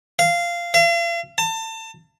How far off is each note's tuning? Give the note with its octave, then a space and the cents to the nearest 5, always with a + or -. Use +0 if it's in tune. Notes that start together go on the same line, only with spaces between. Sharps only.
F5 -15
F5 -45
A5 +30